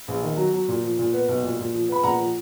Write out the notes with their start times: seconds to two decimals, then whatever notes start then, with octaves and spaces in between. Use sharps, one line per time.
0.08 A#1
0.23 D#3
0.37 F#3
0.53 F#3
0.68 A#2
0.83 F3
0.99 A#2
1.13 B3
1.29 B1
1.43 A#2
1.59 A#2
1.74 F3
1.88 B3 B5
2.03 A#2 F#5 A#5
2.20 F3